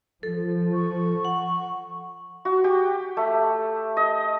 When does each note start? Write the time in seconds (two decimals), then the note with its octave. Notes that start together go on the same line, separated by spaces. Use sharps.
0.23 F3 A4
0.73 C#6
1.25 F#5
2.45 F#4
2.64 G4
3.17 A3
3.97 D#5